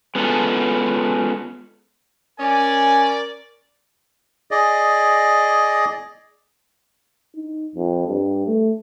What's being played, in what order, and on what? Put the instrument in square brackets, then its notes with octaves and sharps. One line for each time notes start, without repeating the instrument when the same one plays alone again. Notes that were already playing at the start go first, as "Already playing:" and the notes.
[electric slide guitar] G#3 B3 C#4 F4 A4
[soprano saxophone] C#4 [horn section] A#4 D5 [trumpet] G#5
[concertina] G#4 D5 D#5
[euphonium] D#4
F2
G2
A3